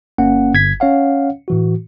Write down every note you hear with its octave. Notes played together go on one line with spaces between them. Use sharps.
G1 A#3 C#4 F#5
G1 G#6 B6
C#4 C#5 F5 F#5
A2 E3 F#4